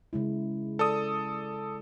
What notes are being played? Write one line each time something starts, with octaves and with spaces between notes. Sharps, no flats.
C#3 G#3 E4
A4 D5 D#6